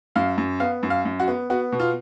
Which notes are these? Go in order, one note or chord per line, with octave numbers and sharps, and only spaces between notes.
F#2 F5
F#2
B3 F5
F#2
F5
F#2
F#4
B3
B3 F#4
B2
F4